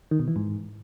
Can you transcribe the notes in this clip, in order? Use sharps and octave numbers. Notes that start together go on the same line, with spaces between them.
D#3
B2
E3
G#2